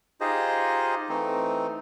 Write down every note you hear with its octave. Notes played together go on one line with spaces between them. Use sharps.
D#4 F4 G4 G#4 C5 D#5
E3 A3 C4 D#4